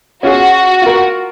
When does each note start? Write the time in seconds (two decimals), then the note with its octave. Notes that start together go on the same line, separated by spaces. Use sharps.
0.23 C#4 F4 F#4 G#4
0.82 F4 A#4